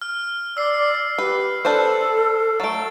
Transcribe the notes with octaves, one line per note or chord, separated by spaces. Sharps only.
F6
D5 E6 C7
G4 B4
D4 A4 B4 C5
F#3 A3 A6 D7